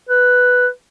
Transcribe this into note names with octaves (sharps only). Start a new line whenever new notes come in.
B4